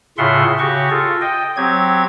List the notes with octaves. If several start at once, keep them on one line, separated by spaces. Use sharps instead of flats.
A2 C#3 F4 E5 F#5 C6
C#3 F#4 G4 C#6
F4 A4
D#5 G5
F#3 C4 G4 G#6